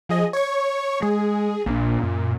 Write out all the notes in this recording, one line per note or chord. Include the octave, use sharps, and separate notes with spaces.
F3 G#4 D#5
C#5 C#6
G#3 G#4
A#1 A#2 C4 D4
F#2